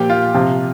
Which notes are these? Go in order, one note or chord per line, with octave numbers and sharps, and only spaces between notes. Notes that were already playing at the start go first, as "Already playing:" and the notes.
Already playing: A#2 F3 G4
F4
C3 F3